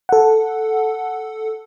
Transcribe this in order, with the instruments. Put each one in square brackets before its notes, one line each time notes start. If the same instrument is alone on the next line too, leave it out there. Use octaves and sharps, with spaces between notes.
[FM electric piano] A4 F#5